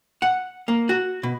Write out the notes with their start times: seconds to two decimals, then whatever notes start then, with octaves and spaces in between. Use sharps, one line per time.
0.22 F#5
0.68 A#3
0.89 F#4
1.23 B2